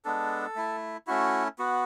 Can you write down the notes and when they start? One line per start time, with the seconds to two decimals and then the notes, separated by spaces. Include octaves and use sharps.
0.05 G#3 B3 D4 A4
0.56 A3 E4
1.07 A3 C#4 E4 F#4
1.59 B3 F#4